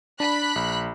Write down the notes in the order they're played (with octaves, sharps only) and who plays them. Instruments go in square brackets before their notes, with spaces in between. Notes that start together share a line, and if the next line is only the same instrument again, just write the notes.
[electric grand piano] D4 [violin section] B5 F#6 B6
[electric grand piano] A#1